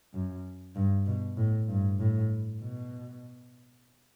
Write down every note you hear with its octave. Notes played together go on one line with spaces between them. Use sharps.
F#2
G2
B2
A2
G2
A2
B2